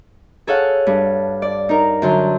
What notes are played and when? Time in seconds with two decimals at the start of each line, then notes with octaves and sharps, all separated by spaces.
0.47 G#4 A4 C#5 F5 F#5
0.87 G2
1.42 D5
1.69 D#4 A#4
2.02 F#2 D3 C6